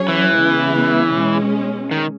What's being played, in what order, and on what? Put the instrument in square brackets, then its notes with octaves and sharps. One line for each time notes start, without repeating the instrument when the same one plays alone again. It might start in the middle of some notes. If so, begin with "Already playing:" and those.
Already playing: [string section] F#3 C#4 G#4 C#5
[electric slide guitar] E3
[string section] C#3 G#3 B3 E4
B2 G#3 C#4
[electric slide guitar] D#3